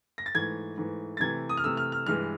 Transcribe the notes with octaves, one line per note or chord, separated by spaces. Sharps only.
A#6
A6
G#2 E3 A3 G#6
G#2 E3 A3
A6
C3 E3 A3 G#6
D#6
F6
C3 E3 A3 E6
F6
F6
G2 E3 G#3 F6